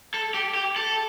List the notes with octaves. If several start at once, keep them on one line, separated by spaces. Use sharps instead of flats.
A4
G4
G4
A4